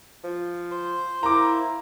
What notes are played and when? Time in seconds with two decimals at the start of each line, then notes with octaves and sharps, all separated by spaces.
0.24 F3
0.71 C5
1.23 A#3 E4 A#5 D6